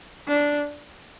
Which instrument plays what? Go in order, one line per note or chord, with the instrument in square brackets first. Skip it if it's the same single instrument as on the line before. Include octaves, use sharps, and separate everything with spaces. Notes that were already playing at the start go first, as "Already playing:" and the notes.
[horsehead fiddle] D4